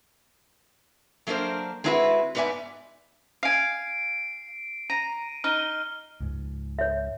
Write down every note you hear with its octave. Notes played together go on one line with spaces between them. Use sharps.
F#3 A3 A#3 D4 A#4 C5
G#3 C4 D4 E4 F#4 B4
G#2 B3 B4 D5 E5 G#5
F5 G#5 C7 D7
A#5 D#7
D#4 F6 G7
C#2 G#2
C#5 E5